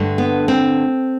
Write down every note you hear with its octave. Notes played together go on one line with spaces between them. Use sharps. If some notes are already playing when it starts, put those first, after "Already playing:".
Already playing: G2 D3 A3
B3
C4